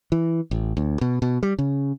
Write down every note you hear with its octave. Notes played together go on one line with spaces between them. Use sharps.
E3
A1
D2
B2
B2
G3
C#3